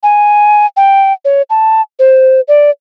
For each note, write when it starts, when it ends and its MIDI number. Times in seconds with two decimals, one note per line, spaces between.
0.03 0.66 80
0.76 1.13 79
1.25 1.42 73
1.50 1.81 81
1.99 2.41 72
2.48 2.70 74